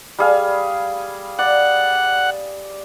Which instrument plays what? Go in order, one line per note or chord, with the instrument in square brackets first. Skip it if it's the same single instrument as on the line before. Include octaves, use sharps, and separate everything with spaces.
[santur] G3 G#4 F5
[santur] D5 [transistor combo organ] F#5